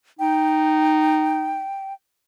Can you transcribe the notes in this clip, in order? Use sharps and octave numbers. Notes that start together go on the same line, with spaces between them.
D#4 G5